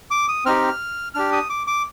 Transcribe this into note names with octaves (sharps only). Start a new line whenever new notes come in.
D6
D#6
C4 D#4 G4 F6
D4 G4 F6
D#6
D6
D6